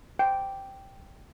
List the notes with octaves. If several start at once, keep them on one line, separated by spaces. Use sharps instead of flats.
G5